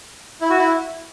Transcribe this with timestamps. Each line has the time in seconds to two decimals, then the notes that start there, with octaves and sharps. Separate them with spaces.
0.41 E4
0.50 F#4
0.59 E4